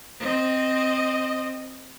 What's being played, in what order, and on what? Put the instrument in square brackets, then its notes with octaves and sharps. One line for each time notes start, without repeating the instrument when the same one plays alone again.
[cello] C4 D#5